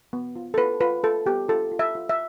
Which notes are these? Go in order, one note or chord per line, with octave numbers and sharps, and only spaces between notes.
B3
F4
A4
F4 B4
F4 B4
F4 A4
B3 G4
F4 A4
F4
E5
F4
E5